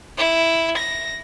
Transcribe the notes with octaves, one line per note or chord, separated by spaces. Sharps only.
E4
A#6